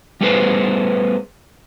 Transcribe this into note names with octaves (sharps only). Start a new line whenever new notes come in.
G3 A3 B3 G#4 B4 C5